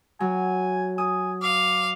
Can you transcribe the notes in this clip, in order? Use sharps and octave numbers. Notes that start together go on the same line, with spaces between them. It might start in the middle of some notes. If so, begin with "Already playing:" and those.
F#3 G#5
G#5 D#6
F5 D6